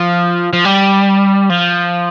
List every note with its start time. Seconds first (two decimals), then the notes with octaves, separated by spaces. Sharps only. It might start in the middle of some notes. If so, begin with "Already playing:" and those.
Already playing: F3
0.53 F3
0.65 G3
1.50 F3